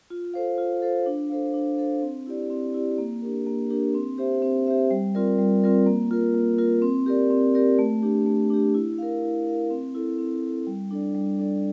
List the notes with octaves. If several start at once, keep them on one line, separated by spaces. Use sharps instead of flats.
F4
A4 C5 F5
F4
A4 C5 F5
D4
A4 C5 F5
D4
A4 C5 F5
C4
E4 G4 D5
C4
E4 G4 D5
A#3
D4 G4 A#4
A#3
D4 G4 A#4
C4
G4 C5 E5
C4
G4 C5 E5
G3
C4 F4 A#4 D5
G3
C4 F4 A#4 D5
A#3
F4 A#4
A#3
F4 A#4
C4
G4 A#4 D5
C4
G4 A#4 D5
A3
D4 G4
A3
D4 G4
E4
A#4 F5
E4
A#4 F5
C4
E4 A4
C4
E4 A4
G3
D4 A4 D5
G3
D4 A4 D5